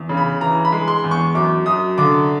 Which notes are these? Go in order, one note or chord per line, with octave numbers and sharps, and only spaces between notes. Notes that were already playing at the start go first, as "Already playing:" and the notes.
Already playing: E2
C#3
B5
E3 A#5
B5
G#3
C6
E2
C#6
F#2 D6
F#2 D#6
D3 D6